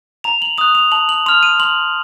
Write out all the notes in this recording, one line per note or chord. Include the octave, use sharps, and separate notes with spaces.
A#5 F7
F#7
D#6 F#6 F7
F7
A5 F#7
F#7
C6 F6 F7
D#7
C6 F#7